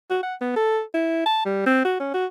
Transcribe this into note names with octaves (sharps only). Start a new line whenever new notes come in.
F#4
F#5
B3
A4
E4
A5
G3
C4
F#4
C#4
F#4